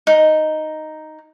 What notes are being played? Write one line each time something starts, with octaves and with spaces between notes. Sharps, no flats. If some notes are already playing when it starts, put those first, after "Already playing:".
D#4